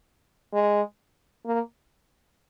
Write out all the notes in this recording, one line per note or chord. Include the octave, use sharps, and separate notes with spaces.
G#3
A#3